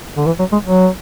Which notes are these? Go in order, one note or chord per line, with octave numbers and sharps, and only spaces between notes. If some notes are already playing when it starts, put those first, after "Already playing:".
D3
E3
F#3
G#3
F#3